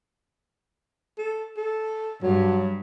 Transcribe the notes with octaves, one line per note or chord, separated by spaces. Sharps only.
A4
A4
G2 F#3